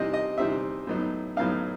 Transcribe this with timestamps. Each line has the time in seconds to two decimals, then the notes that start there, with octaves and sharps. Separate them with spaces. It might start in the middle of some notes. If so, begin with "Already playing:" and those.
Already playing: C3 E3 G3 C4 D#4 D#5
0.13 D#5
0.38 C3 E3 G3 C4 D#4 E5
0.87 A2 F#3 B3 D#4
1.36 A2 F#3 B3 D#4 F5